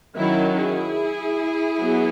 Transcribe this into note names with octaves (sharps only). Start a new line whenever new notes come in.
D#3 F#3 C#4 E4
E4 G#4
F#3 B3